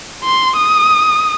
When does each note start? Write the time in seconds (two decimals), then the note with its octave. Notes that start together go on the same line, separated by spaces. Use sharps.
0.24 C6
0.56 D#6